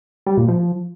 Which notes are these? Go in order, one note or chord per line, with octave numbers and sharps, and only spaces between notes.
G3
A#2
F3